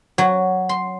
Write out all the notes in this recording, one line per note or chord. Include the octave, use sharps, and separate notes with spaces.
F#3
C6